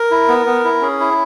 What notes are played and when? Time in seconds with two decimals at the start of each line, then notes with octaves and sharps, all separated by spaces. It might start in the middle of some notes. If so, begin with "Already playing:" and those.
Already playing: A#4
0.11 E4
0.28 B3
0.46 B3
0.65 E4
0.81 C#4 G#4
1.00 E4